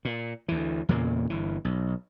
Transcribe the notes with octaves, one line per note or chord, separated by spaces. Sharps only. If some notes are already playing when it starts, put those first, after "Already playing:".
A#2
D2 E3
E2 A#2 C#3 A#3
G1 E3
B1